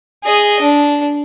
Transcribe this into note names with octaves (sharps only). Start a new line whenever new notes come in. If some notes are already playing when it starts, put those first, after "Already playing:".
G#4 D#5
D4